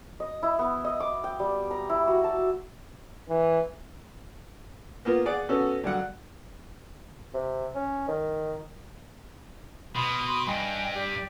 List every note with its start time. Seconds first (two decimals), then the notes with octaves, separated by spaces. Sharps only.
0.20 D#5
0.43 E4
0.59 B3
0.84 D#5
1.00 D6
1.24 G5
1.40 G3
1.71 A#5
1.89 E4
2.07 F#4
2.24 A5
3.29 E3
5.05 A#3 B3 F4
5.25 G#4 D5 F#5
5.49 B3 C#4 F#4 A4
5.84 G2 D3 F#3 F#5
7.34 C3
7.75 C#4
8.08 D#3
9.95 B2 B5 C6 D#6
10.47 G2 D#5 G5 G#5
10.94 G4 D5